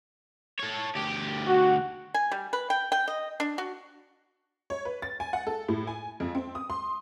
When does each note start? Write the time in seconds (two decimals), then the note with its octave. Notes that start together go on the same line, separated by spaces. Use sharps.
0.59 A4 C#5
0.95 D2 G4
1.47 F#4
2.14 G#5
2.31 G3
2.53 B4
2.70 G5
2.92 G5
3.08 D#5
3.40 D4
3.58 F#4
4.70 C#5
4.85 B4
5.02 A6
5.20 G#5
5.33 F#5
5.47 A4
5.68 A2
5.87 G#5
6.20 F2
6.35 C4
6.55 D#6
6.70 C6